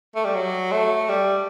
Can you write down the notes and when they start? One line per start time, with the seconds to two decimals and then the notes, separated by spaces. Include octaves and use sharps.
0.15 A3
0.25 G3
0.35 F#3
0.72 A3
1.09 G3